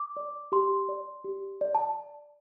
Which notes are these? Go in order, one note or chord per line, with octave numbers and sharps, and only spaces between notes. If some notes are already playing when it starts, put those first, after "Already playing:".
Already playing: D6
D5
G4 C6
D5
G4
D5
A5